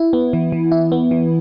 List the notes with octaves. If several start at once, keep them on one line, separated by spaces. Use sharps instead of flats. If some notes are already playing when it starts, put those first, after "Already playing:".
Already playing: E4
B3
E3
E3
E4
B3
E3